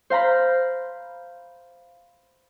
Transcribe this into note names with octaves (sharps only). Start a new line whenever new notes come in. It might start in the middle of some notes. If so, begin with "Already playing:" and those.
C5 F5 A#5 B5